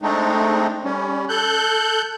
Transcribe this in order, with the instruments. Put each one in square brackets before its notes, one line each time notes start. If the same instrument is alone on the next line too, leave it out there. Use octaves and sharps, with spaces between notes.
[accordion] G#3 A3 C4 D4 D#4
G3 C#4
A4 F#6 G6